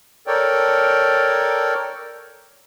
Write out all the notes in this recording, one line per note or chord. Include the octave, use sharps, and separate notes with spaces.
A4 A#4 C#5 D5 G5